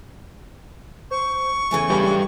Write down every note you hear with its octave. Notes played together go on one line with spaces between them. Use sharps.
C5 C#6
E2 C#3 E3 A3 G#5
G3 G4 B4